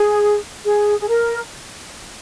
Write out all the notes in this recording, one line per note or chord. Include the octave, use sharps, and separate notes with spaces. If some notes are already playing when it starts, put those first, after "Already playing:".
Already playing: G#4
G#4
G#4
A#4